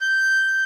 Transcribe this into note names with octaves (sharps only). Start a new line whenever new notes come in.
G6